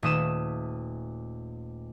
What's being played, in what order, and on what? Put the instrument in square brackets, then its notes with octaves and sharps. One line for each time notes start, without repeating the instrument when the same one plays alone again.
[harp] D#1 A3 D#6 D#7 E7